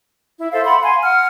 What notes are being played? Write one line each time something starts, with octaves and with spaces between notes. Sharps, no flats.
E4
A4 C5 E5 F5
F#5 B5 C6
F5 G#5 C6
F#5 F6